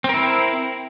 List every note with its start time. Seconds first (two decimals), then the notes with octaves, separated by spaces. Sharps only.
0.04 C4
0.09 A#4
0.14 E4